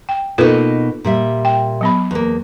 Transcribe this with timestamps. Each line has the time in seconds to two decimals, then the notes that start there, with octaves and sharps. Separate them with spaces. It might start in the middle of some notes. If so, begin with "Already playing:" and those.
0.09 G5
0.38 B2 A#3 D#4 F4 A4 B4
1.04 A#2 G3 E5
1.45 G5
1.81 F#3 B3 B5
2.11 E2 A#3